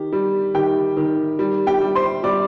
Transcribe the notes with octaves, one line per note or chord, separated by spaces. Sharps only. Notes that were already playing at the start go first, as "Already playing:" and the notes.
Already playing: D#3 G4
G3
D#3 G4 G5
D#3
G3
G4 G5
G3
C5 C6
G3 D5 D6